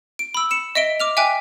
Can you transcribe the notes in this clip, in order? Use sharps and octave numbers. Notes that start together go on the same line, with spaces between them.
D7
B5 E6
C#7 E7
D#5 E5 D7 G7
D6 F6 F7
E5 G5 G#5 D6 F#6